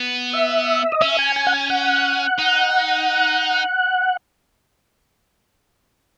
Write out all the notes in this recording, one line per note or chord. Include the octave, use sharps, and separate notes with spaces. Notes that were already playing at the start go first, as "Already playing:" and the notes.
Already playing: B3
E5
D#5
C#4 E5
G#5
G#5
F#5
G#5
F#5
D#4